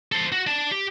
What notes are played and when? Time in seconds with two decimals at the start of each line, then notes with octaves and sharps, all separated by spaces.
0.12 A4 C5
0.32 F#4
0.47 D5 A5
0.71 G4